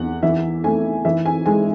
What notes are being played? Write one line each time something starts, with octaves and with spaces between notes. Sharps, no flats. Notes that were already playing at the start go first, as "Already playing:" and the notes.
Already playing: E2 F#5
E3 E5
A3 G#5
E3 E5
G#5
G#3 G#5